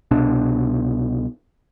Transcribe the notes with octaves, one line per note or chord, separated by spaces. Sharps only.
C2 B2 D4